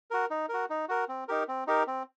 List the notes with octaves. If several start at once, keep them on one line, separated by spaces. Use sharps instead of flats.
F#4 A#4
D#4
F#4 A#4
D#4
F#4 A#4
C4
D#4 G4 A#4
C4
D#4 G4 A#4
C4